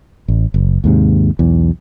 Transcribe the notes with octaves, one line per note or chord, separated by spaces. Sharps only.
A1
F#1
D#2 G#2 C3
B1 E2